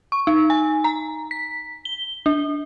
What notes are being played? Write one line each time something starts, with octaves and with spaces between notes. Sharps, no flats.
C#6
D#4
G#5
A#5
B6
G7
D4